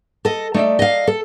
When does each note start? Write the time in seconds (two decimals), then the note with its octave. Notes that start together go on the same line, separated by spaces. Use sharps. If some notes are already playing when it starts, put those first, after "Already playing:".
0.25 A4 D#5
0.54 A3 D#4 D5 E5
0.79 D#5 F5
1.07 A4